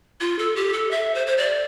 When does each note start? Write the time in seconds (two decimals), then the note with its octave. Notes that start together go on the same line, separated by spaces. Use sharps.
0.21 F4
0.39 A4
0.56 G4
0.73 A4
0.91 E5
1.15 C5
1.27 C5
1.38 D5